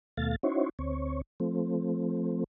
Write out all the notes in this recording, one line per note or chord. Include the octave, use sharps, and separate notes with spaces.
D#2 B2 A3 F5 A6
C#4 D#4 E4 F#4 C5 C#5
D2 C4 C#5
F3 A3 C4